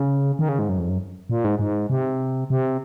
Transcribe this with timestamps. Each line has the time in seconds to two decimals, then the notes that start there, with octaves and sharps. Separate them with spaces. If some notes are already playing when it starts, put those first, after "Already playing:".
Already playing: C#3
0.39 D#3
0.49 C#3
0.59 G#2
0.69 F#2
0.78 F2
0.89 F#2
1.30 A#2
1.45 G#2
1.59 G#2
1.90 C3
2.50 C3